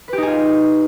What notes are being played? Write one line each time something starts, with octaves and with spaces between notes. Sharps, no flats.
D#4 F4 G4 G#4 B4